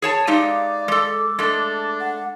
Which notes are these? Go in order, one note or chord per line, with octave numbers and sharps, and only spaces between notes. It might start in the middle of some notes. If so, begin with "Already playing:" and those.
G#4 C#5 A5
G#3 D#4 G4 D5 F5
G#3 A4 D6
G#3 A3 D4
F#5